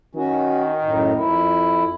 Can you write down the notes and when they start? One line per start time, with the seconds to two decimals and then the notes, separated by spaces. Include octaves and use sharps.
0.15 D#3 C#4 F#4
0.82 F#2 A2 D#4
1.16 F2 E4